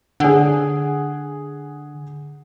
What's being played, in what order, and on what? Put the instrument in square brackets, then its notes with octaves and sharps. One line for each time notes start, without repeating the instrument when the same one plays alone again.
[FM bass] D3 [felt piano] G#4 F#5